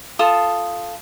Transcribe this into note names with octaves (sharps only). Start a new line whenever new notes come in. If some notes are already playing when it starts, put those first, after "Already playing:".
F4 A4 A5 D#6